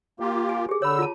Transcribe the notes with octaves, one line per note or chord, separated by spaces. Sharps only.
A#3 F4 G4
G#5
G4 G#4
D3 C#5 B5 E6
F4 A5